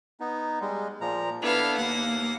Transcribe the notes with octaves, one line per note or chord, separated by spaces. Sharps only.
B3 D#4
G3 G#3
A#2 F3 A#5
B3 D4 E4 A4 F5
D#2 A#3 F5 F#5